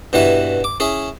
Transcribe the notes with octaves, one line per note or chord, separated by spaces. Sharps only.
G2 B2 E3 E4 B4
D6
C#4 E4 G#4